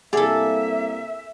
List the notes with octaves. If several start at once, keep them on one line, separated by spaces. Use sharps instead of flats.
C2 A#3 G#4 A4 D5 E5